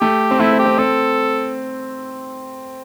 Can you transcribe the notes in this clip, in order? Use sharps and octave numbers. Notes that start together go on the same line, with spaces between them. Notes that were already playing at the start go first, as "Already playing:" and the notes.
A3 G4
C4
A3 E4
C4
G4
C4
C4 A4